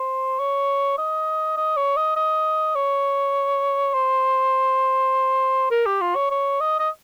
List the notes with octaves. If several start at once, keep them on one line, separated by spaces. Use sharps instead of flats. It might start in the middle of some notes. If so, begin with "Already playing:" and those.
Already playing: C5
C#5
D#5
D#5
C#5
D#5
D#5
C#5
C5
A#4
G4
F4
C#5
C#5
D#5
D#5